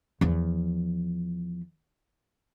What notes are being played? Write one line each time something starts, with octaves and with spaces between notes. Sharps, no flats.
E2 F3